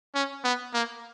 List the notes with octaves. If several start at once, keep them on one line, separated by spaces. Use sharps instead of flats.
C#4
B3
A#3